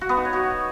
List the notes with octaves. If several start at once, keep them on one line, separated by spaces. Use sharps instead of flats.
F#4
B3
D#4
C#5
F#4